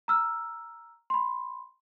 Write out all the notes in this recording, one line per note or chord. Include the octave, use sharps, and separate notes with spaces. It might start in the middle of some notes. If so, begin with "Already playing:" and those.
A#5 E6 F6
B5 C6